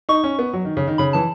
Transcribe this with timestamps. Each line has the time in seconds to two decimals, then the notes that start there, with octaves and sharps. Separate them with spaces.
0.09 D#4 C#6
0.24 C#4
0.39 B3
0.53 F#3
0.65 D#3
0.77 C#3
0.87 D#3
0.98 C#3 B5
1.13 E3 A5